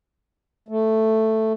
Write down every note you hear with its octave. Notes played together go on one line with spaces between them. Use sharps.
A3